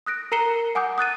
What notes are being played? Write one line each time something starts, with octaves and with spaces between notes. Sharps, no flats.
D#6 F#6 A#6 D7
A#4 A#5 C7 C#7 E7 G7
F#5 G#5 D6 D#6 G6
D#6 F#6 A6 D#7